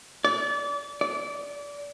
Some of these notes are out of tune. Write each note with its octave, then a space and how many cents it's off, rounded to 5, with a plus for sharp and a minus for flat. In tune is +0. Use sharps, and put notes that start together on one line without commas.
D5 -30
D5 -25